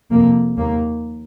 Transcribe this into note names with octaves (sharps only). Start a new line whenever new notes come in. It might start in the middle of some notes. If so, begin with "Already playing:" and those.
F2 C3 A#3
D#2 A#3